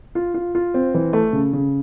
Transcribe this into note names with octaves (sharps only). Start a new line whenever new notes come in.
F4
F4
F4
C4
E3
A3
C#3
C#3